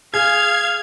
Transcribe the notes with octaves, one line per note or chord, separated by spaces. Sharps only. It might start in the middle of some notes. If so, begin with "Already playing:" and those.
G#4 F5 G#6